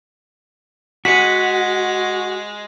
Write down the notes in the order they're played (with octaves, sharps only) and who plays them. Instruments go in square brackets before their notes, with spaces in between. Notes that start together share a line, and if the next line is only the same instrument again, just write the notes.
[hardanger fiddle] G#3 [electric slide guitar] F#4 [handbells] B6 C#7